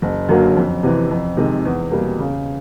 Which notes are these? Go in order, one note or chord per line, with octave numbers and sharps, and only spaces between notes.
F#1
F#2 D3 F#3 A#3
F2
C3 E3
F2
C3 D#3 G#3
E2
B2 G3 A#3
C#3